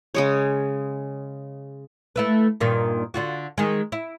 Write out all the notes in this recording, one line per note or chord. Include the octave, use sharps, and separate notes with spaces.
C#3 G#3 C#5
A3 E4 B4
G2 A#2 D#3
D3 F4 F#4
D#3 G#3
E4